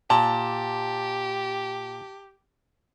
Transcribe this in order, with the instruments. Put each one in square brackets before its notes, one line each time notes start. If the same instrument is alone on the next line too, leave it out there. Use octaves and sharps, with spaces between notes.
[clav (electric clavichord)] A#2 [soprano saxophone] G4 [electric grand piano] A5